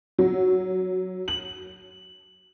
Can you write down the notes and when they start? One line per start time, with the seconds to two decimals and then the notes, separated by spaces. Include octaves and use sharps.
0.18 F#3
1.28 F#7